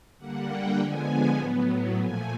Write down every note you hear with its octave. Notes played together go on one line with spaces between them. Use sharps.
D3 G3 A#3 F#5
G5
D3 F3 G#3 B3 G#5
A2 F#3 B3
A#2 F3 A3 G#5